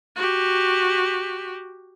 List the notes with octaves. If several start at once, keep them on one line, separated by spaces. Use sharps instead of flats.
F#4 G4